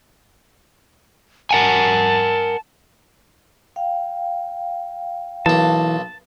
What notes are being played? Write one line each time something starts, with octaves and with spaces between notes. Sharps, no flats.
A#4 F#5 G#5 A5
F5 G5
B1 E3 A#3 A5